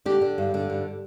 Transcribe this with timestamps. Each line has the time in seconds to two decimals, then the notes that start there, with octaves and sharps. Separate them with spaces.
0.06 D3 G4
0.21 D3
0.38 G2
0.54 D3
0.70 G2